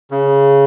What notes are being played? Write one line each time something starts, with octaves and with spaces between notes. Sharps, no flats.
C#3